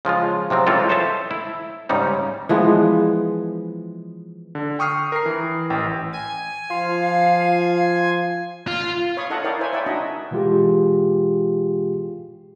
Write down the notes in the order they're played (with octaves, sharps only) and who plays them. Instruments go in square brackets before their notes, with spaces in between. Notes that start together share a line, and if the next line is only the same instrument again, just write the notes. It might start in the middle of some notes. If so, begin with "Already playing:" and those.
[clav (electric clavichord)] C#3 F3 G#3 F4
C3 F3 F#3 C4
E3 G#3 C4 C#4 F4 A4
A4 C5 C#5 D#5 E5 A5
E4
G#2 C#3 G3 C#4 D#4
[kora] E3 F3 G#3 B3
[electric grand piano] D3
G5 C#6 D#6 F6 C7
A#4 C7
E3
A1 G5
[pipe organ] G#5 [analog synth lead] G#6
[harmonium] F3 [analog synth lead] F4 [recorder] F5
[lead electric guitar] F4
[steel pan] C#5 F5 B5 C#6 D#6
E4 A4 D#5 F5 F#5 A5
E4 A#4 C#5 D5 F5 G5
C5 C#5 E5 G#5
E4 C#5 D5 E5 F#5 G5
D4 D#4 F#4 D#5
[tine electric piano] B2 E3 G#3 F4 G4 G#4